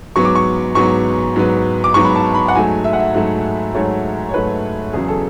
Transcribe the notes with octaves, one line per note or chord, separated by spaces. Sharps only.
G#2 F#3 B3 C#6
D6
C#6
G#2 F#3 B3 C#6
G#2 F#3 B3
D6
G#2 F#3 B3 C#6
B5
A5
B5
F#5
G#2 F#3 A3 G#5
E5
F#5
E5
G#2 F#3 A3
G#2 F#3 A3 C#5
C#5
G#2 F#3 A3 B4
E2 C#3 F#3 G#4
A4